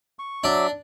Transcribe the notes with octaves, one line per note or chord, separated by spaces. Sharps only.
C#6
F#3 D4 D5 E5